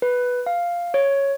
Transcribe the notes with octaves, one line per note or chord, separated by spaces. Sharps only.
B4
F5
C#5